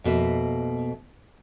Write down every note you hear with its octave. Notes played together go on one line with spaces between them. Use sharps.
F2 B2 A#3 E5